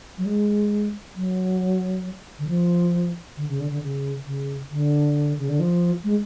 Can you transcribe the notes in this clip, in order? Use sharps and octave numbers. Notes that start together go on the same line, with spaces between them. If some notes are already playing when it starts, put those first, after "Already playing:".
F#3
G#3
F#3
D3
F3
D3
C#3
D3
D3
C#3
C#3
D3
C#3
D3
F3
G#3